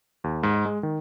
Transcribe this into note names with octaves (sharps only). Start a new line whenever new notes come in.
D#2
G#2
G#3
D#3